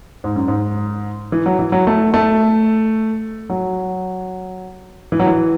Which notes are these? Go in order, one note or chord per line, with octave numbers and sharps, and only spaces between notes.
G#2
F#2
G#2
E3
F#3
E3
F#3
A3
A3
F#3
E3
F#3
E3